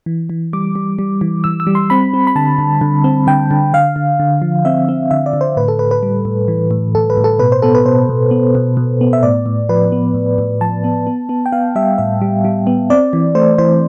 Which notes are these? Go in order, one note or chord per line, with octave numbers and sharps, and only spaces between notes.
E3
E3
G3 D6
G3
G3
E3
E3 E6
E6
G3
C6
C4 B5
C4
B5
D3 A5
D3
D3
C4
D3 G5
D3
D3 F5
D3
D3
F3
C4 E5
C4
D3 E5
D5
D3
C5
A2 B4
A4
A2 B4
B4
G3
A2
E3
A2
A2 A4
B4
A2
A4
B2 B4
C5
B3 A4
B4
B2 C5
B2
B3
B2
B2
B3
E5
A2 D5
A2
F3 B4
B3
A2
A2
F3 A5
B3
B3
B3
G5
B3 F5
G3 E5
A2 E5
G3
G3
B3
C4 D5
E3
A3 C5
E3 C5